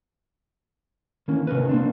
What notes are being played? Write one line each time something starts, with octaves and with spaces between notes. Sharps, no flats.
D#3 E3 A#3 C#4
C3 C#4 A#4 B4
A#3 C4 D4